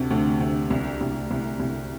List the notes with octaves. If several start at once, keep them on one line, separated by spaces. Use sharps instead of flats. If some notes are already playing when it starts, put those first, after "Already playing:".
Already playing: D2 C3
D2
D2
C2
C2
C2
C2